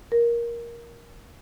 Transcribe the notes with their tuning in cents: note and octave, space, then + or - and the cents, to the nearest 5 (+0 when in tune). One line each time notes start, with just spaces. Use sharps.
A#4 +10